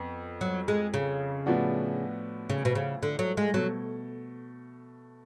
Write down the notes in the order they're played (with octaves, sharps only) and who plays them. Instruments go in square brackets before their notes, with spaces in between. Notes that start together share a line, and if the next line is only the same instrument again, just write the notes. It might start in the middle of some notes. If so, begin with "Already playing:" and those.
Already playing: [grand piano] F2 B3
[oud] F#3
G#3
C#3
[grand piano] A2 F3 B3 D4 F#4
[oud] C#3
B2
C#3
D3
F#3
G#3
[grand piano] B2 A3 [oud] F#3